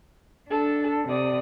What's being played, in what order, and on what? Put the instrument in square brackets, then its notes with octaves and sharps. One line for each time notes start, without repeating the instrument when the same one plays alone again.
[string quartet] D4 [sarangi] A4
[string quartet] C3 D#6 [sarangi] D5